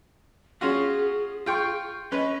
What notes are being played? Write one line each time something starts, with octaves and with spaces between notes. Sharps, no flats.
C#4 F4 F#4 G#4
F4 G5 C#6
C#4 B4 D#5